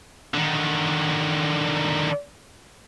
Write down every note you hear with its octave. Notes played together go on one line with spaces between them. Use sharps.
D3 D#3